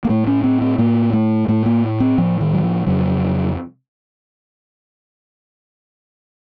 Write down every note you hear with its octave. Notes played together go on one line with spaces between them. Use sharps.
A#3
A2 A3
C#4
C4
C4
A2 A#3
A3
A2 A3
A#3
C4
A2 F3
D#3
F#3
F3
F2 C#3 F#3